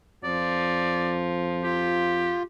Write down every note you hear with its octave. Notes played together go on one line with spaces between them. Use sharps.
F2 F3 D5
F4 G4